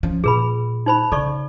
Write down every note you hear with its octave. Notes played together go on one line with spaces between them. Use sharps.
F3 C#4
A#2 G#4 B4 B5
D#4 C5 B5
C#3 A4 D5 C#6